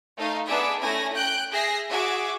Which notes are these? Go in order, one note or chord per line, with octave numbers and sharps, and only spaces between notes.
A3 D#4 F5
B3 D4 G#4 E5 D6
A3 C#4 E4 G#5 A#6
G5 F#6 G6 D7
G#4 E5 A#6 C7
F#4 G#4 E5 D6